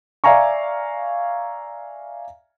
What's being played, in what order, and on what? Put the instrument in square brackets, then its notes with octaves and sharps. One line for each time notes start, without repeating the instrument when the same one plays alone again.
[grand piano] D5 E5 F5 G#5 A#5 C#6